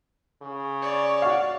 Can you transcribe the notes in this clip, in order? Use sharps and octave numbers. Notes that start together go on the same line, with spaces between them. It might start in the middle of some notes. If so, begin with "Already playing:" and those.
C#3
C#5 D5
F#4 F5